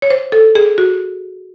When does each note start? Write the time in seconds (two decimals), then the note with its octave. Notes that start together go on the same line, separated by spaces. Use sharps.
0.02 C#5
0.10 C5
0.32 A4
0.55 G#4
0.78 F#4